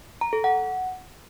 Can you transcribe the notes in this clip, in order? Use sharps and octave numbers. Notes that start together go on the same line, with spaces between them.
A#5
A4
F#5